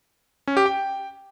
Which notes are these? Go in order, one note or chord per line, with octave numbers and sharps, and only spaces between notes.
C#4
G4
G5